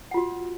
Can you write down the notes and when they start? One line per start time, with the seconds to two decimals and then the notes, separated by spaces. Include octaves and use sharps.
0.11 F#5
0.14 F4
0.17 F#4